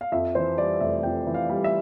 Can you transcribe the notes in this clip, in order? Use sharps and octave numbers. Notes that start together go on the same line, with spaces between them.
F5
F2 E5
E3 C5
G3 D5
F1 E5
F2 G5
E3
F5
G3
E5